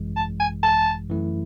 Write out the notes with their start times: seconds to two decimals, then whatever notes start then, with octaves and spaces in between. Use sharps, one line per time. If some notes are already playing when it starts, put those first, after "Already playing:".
Already playing: G#1 F#2 E3 G#3
0.17 A5
0.40 G#5
0.63 A5
1.10 F#2 E3 A3 E4